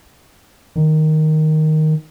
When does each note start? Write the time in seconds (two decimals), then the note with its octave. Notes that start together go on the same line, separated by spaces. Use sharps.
0.76 D#3